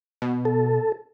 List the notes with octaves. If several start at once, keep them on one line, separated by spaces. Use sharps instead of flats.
B2
A4